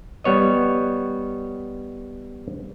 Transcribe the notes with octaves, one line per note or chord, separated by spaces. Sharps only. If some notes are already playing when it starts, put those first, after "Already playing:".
G3 B3 C#5 D#5